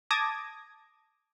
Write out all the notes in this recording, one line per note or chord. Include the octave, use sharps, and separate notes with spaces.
A5 D6 D#6 G#6 A#6